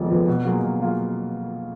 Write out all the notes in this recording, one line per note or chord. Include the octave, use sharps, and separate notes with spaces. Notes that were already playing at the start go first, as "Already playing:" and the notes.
Already playing: F1 F2 F3 G#3 B3
F2 F3 G#3 B3
B2
F#3 A#3 F4 G#4
B2
F#3 A#3 F4 G#4